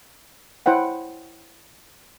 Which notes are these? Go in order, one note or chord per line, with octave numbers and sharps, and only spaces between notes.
E4 C5 C#5 F#5 G5